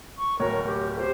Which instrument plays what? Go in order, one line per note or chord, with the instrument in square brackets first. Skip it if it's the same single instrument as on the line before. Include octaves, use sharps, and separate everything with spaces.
[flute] C#6
[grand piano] D1 C#5 [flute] A#4
[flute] G4
[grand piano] G4 [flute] C5